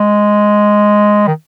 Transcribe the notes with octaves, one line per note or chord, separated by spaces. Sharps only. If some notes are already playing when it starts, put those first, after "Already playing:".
Already playing: G#3
D#3